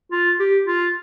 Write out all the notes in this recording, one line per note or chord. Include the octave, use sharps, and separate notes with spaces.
F4
G4
F4